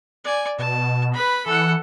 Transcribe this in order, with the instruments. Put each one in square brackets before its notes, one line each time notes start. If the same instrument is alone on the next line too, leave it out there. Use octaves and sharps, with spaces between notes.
[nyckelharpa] D5 G#5
[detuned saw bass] B2 [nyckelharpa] A5
[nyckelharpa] B4 B5
[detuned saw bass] E3 [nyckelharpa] A4 F#5